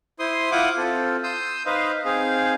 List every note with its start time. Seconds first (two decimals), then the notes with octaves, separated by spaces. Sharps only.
0.19 E4 C5 C6 D#6
0.52 E4 F4 F#5 D6 D#6
0.77 C4 F4 A4
1.23 C6 D#6 E6 G6
1.66 D#4 B4 C5 D#5 F5
2.05 C4 D#4 G#4 F5